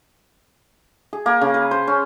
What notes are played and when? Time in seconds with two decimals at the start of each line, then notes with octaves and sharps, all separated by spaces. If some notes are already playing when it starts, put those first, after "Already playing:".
1.13 G#4
1.26 A#3
1.41 C#3
1.54 B4
1.71 C5
1.87 C#4